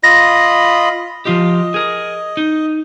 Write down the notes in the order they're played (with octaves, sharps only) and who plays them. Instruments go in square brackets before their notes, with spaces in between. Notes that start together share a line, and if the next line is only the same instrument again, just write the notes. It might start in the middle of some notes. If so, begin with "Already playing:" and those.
[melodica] F4 D#5 B5 [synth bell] A#6
[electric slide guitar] F3 F4 G4 [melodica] D#5
[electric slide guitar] G#4 A#4
D#4